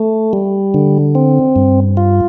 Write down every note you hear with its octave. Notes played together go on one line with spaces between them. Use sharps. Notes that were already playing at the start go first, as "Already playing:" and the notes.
Already playing: A3
G3
D3
C4
G2
F4